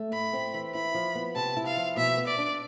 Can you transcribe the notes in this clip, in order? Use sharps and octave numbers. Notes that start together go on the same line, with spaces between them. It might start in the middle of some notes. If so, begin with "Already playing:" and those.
Already playing: A3
A2 B5
C4
E3
E4 B5
F3
B3
C3 A5
E4
F5
F3
B2 E5
B3
D5
D4